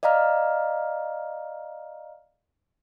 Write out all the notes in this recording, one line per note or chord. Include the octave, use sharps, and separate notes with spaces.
D5 D#5 F5 A#5 F6